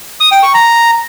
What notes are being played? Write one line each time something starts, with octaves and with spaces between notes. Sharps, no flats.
D#6
G5
C#6
A#5